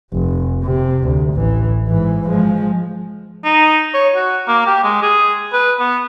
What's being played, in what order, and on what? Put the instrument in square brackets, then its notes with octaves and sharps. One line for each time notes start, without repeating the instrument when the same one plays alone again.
[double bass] F1
C3
D2
A1 E3
G#2 E3
F3 G#3
[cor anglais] D#4
C#5
F#4
A#3
G4
G#3
G#4
B4
B3